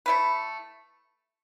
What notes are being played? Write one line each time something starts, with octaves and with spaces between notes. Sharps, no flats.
A3 E4 B4